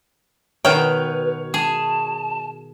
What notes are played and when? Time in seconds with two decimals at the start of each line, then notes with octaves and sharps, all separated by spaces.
0.65 B2 D#3 B4 C#5 G5 F6
1.54 G#4 A5